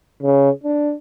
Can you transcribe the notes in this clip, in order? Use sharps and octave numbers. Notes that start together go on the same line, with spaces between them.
C#3
D4